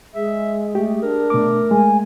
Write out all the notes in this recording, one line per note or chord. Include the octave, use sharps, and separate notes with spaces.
G#3 G#4 E5
A3 G4
D4 A#4
B2 A3 D6
G#3 G#5